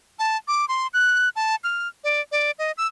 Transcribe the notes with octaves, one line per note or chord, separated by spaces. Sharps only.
A5
D6
C6
F#6
A5
F6
D5
D5
D#5
E6